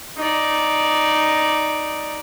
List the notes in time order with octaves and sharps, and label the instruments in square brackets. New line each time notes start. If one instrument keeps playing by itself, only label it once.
[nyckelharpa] D#4 D5